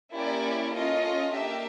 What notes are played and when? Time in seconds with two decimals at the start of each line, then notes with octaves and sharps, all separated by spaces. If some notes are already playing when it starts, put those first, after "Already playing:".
0.15 A#3 C#4 E4 G4 D5
0.74 C#4 F4 A4 D#5
1.34 A#3 D4 G4 E5